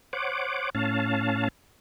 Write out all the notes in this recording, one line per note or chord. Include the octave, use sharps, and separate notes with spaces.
C5 C#5 F#5 D6
A2 C#4 F5 A5